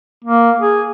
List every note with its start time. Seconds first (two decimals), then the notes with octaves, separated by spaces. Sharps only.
0.24 A#3
0.60 G#4